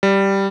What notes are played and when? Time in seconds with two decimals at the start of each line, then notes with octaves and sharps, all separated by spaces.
0.03 G3